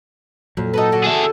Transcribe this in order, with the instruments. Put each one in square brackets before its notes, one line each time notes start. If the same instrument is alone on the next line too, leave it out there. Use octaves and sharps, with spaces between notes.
[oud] F2 [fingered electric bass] A#2 F#3
[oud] D#4 F#4 B4 [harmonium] A4
[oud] D3 F#4
[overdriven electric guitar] G#4 E5